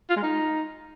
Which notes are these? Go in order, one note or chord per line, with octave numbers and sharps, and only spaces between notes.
F4
G#3
D#4